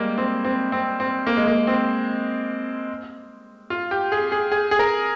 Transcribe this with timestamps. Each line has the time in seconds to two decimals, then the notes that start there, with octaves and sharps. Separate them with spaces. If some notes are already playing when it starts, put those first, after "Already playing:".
Already playing: G3 G#3 A#3
0.18 C4
0.45 C4
0.72 C4
1.00 C4
1.27 A#3
1.37 G#3
1.47 A#3
1.67 C4
3.70 F4
3.91 G4
4.12 G#4
4.32 G#4
4.52 G#4
4.71 G#4
4.79 A#4